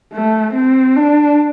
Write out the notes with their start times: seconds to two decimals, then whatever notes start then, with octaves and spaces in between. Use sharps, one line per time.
0.13 A3
0.54 C4
0.96 D4